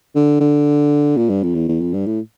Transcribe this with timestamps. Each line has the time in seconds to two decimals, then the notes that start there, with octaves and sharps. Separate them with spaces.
0.15 D3
0.40 D3
1.16 A#2
1.29 G2
1.43 F2
1.55 E2
1.68 E2
1.80 F2
1.93 G2
2.06 A2